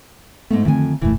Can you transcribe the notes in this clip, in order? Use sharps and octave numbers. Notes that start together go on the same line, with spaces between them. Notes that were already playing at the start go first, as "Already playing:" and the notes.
G#2 A3 B3
F2 D3 D#3 G#5
D#1 F#2 B2 E3 A3